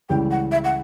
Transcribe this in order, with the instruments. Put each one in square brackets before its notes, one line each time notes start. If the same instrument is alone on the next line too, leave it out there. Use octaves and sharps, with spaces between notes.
[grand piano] C#2 C#3 E3 G3 [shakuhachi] G5
[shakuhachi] F#5
E5
F#5